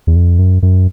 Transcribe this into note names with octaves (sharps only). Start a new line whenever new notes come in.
E2
F2
F#2
F#2